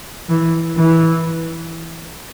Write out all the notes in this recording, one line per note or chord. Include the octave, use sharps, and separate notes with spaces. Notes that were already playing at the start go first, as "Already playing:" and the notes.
E3
E3